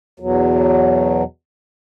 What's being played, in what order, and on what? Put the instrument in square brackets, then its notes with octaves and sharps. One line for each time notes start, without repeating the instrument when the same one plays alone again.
[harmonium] E2 B2 F#3